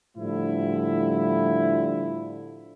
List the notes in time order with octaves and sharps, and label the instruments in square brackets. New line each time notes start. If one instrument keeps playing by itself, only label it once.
[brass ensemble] A2 D3 F3 G3 E4